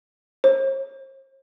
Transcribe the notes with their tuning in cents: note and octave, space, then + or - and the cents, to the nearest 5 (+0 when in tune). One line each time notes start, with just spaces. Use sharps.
C5 +45